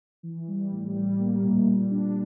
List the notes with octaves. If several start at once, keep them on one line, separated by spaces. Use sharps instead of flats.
E3
G3
A2
G3
A#3
A#2
G3
D4